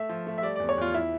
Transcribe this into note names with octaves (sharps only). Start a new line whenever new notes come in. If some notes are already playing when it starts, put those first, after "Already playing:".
Already playing: A3 E5
F3
A3
E5
G3 D5
E2 D5
C#5
E2 F4
E4